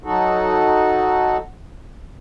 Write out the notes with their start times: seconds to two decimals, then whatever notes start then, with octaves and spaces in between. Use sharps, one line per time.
0.04 F#3 D#4 F#4 A4